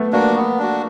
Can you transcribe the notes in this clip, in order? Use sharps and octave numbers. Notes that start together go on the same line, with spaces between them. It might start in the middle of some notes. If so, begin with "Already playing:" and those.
Already playing: A3 B3
A#3 D4 F#4
B3
D4 F#4